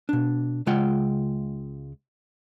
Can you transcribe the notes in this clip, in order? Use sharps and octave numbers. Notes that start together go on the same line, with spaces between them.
B2 D4
C#2 C#3 G#3 F4 F#5 G5